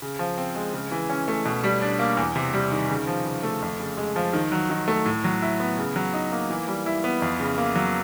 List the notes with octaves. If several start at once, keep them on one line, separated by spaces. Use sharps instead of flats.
C#3
F3
C4
G#3
C#3
E3
C#4
A3
B2
G3
D4
A#3
E2
C3
G3
D#3
C#3
F3
C#3
A3
F2
C#3
G#3
F3
D#3
F#3
D#3
A3
A2
F#3
E4
B3
C#3
F#3
D#4
A#3
E3
G3
E4
B3
F2
C#3
A#3
F#3